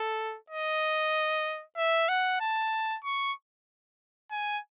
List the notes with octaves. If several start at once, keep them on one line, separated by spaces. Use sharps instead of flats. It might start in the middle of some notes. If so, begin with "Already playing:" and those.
Already playing: A4
D#5
E5
F#5
A5
C#6
G#5